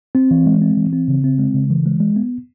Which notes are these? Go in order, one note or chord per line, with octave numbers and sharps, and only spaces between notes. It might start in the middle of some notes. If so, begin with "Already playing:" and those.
C4
E3
G#3
C4
E3
C4
C#3
C4
G#3
C#3
E3
G#3
G#3
B3